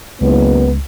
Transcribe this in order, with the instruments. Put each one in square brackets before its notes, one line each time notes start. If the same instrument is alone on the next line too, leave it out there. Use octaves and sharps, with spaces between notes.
[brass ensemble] F#1 [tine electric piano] C#2 [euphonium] B3